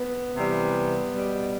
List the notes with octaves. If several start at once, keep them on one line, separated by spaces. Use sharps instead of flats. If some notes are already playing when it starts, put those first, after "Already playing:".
Already playing: B3
C3 E3 G3
B2 G3